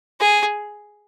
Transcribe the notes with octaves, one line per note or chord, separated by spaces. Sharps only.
G#4